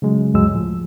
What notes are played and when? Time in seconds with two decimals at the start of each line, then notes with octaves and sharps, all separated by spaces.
0.02 C#3 F#3 G#3
0.34 D2 G2 F#3 G#3 E6
0.52 A2 F3